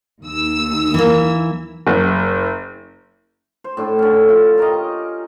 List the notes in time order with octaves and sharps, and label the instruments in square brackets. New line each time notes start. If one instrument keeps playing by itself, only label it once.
[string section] D#2 E6
[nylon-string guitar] E3 A#3
[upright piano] F#1
[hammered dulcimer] C5
A2 D4 A4 A5
D3 C#4
F4
G4 A#4 C#5 D#5